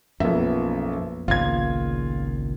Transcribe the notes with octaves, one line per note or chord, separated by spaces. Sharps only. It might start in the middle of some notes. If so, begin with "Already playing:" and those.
B1 F#2 F3 A#3 B3 E5
G#1 C#2 A#2 F4 G#6